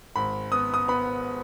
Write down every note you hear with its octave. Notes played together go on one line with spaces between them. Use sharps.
G#1 B5
B3 D#6
D#6
B3 B5